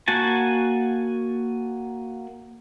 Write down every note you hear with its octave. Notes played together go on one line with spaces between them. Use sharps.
A#3 F#4 G#5 A5